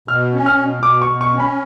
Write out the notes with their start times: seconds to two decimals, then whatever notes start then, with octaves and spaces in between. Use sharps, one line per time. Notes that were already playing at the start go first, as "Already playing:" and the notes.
0.08 B2 F6
0.34 C#4
0.46 F6
0.58 B2
0.83 B2 D6
1.02 C#6
1.08 B2
1.21 C#6
1.34 C#4
1.40 B5